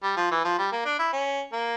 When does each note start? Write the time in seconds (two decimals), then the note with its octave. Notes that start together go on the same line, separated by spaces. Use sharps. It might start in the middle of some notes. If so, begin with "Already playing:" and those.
0.03 G3
0.17 F3
0.31 E3
0.45 F3
0.58 G3
0.72 A#3
0.85 D4
0.99 E4
1.13 C#4
1.53 A#3